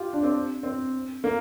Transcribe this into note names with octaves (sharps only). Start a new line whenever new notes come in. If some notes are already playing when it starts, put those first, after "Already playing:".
Already playing: F4 G4
D4
C4
C4
A#3